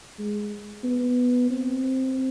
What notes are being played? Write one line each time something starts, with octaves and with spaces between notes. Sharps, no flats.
G#3
B3
C4